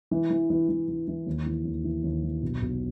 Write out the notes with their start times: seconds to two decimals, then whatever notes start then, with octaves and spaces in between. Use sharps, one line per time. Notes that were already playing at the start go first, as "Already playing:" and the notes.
0.11 E3
0.30 E3
0.50 E3
0.69 E3
0.88 E3
1.08 E3
1.26 D#2
1.46 E3
1.65 D#2
1.84 E3
2.04 D#2
2.23 E3
2.43 B1
2.62 B1